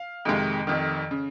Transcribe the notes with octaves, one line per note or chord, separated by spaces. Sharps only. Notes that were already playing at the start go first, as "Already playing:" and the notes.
Already playing: F5
F2 C3 D#3 G#3
F1 F2 D#3
C#3